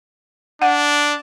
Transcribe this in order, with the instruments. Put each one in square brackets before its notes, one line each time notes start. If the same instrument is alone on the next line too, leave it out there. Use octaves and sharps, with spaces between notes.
[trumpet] D4 [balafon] F#5